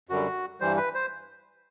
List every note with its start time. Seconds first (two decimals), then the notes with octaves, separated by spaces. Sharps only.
0.09 F#2 D3 G3 F#4
0.60 G2 E3 G3 C5
0.77 B4
0.94 C5